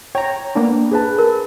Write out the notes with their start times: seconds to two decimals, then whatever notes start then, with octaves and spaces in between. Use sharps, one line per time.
0.15 C#5 G5 A#5
0.55 A#3 B3 D4
0.91 G#4 B4 A5
1.19 A#4